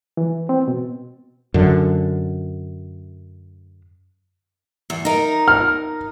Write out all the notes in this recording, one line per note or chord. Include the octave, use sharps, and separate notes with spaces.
E3
C4
B2
F#2 D3
E2
D#4 A#4
F6